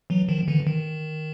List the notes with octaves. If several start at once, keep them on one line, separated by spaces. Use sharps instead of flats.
E3 F#3
D#3 F3
D3 E3
D#3